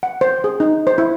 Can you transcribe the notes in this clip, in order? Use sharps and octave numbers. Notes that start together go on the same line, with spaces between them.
F#5
C5
G#4
D#4
C5
E4